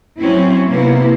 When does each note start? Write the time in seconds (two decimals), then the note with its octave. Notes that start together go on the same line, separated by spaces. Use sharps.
0.18 F#3 C4 C#4 E4
0.70 C3 A#3 B3 E4